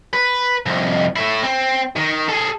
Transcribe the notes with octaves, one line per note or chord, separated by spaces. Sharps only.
B4
C2 F2
A3 E4
C4
D#3
G#4 A4